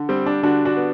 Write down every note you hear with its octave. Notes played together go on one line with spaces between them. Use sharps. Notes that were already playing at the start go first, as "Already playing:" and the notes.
Already playing: D3
G3 C4
D4
D3 D4 F#4
D4 F#4
B3